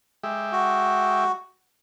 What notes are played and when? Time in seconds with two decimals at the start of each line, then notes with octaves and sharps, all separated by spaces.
0.23 G#3 G4 E5
0.52 F#4